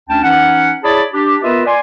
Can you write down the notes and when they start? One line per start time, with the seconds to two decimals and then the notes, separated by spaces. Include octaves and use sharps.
0.09 D2 C#4 D4 G5 A5
0.22 E3 C#4 D#4 F#5
0.83 E4 G#4 C#5 D5 A5 B5
1.12 D4 G4
1.43 B3 F4 A#4 B4 D#5 E5
1.66 D5 G#5 C6